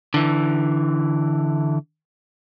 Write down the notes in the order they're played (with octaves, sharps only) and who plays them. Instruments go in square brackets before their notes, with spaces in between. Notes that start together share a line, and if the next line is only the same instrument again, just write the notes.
[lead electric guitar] D3 E3